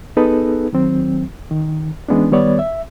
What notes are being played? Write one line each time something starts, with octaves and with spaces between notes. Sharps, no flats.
B3 D#4 G#4 A4 B4
D#3 F#3 C4
D#3
E3 G#3 B3 C#4 D4
D#3 G3 B3 C#5 D5
E5